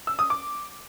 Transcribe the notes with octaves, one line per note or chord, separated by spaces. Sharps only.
E6
D#6
D6